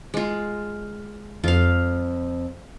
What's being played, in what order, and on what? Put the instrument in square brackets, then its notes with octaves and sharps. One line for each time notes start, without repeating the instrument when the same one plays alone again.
[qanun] G#3 F4
[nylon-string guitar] F2 [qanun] F4 F5